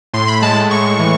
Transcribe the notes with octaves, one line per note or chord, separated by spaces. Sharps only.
A2 C6
B5
G#3 A5
A2 C#6
E3